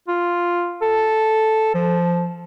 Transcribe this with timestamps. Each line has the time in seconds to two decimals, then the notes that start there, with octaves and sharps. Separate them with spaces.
0.08 F4
0.82 A4
1.74 F3